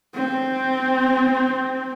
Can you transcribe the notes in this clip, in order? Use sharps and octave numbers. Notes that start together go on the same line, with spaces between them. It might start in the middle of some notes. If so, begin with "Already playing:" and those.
C4